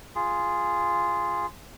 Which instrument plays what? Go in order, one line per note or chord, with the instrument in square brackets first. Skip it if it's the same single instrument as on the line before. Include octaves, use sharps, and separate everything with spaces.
[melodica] F4 G#4